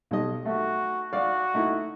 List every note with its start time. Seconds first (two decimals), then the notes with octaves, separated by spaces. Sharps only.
0.11 B1 G3 D#5
0.46 A3 F#4
1.13 F#4 D5 F5
1.54 A3 D#4 E4